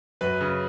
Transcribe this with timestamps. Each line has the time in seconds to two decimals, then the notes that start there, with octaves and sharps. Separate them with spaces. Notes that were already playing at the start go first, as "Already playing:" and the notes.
0.21 F#2 B4
0.41 C#3